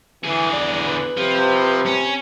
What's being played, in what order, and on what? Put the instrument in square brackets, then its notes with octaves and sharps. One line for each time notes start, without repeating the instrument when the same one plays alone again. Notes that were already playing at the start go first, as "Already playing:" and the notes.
[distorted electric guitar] D3 G#4 [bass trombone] E3
[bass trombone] E2 [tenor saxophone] D5
[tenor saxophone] B4
[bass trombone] C3 [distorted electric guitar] F3
[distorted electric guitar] C#4